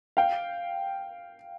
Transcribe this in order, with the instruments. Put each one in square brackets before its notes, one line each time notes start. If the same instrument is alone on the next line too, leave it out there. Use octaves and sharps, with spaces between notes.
[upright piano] F5 G5